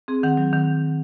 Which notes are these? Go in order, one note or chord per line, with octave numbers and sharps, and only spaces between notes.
C4 G#4
D#3 F#5
F#3
D#3